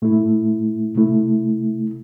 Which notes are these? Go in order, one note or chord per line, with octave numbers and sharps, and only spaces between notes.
A2 A3 E4
C3 A3 E4